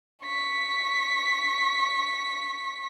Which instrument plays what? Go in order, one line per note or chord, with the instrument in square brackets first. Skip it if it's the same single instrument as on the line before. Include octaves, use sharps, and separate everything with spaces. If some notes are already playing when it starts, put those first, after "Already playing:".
[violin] C#6 B6